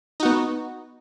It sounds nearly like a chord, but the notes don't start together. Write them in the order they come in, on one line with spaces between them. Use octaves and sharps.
D#4 F#4 B3